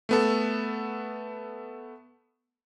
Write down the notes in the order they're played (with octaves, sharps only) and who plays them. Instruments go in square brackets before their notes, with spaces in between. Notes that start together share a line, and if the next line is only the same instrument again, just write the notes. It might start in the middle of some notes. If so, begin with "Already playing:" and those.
[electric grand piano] A3 B3 A4